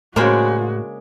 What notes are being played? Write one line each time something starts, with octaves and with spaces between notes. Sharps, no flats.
A2 C#3 G#3 A#3 D4 F#4 C5 B5